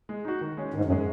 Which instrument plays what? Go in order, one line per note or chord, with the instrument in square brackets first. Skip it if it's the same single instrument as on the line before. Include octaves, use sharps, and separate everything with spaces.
[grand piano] G#3
D#4 F#4
D#3
G#3 C#4 G#4
[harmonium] G#2 [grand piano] D#3
[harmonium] F#2
[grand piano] G#3 C#4 G#4